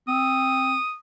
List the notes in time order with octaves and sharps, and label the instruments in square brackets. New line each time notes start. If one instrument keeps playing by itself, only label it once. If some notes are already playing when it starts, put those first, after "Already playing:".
[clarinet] C4 [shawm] D#6